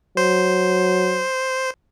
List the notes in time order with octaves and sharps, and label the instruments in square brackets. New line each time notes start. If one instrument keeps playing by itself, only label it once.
[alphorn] F#3 [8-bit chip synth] C5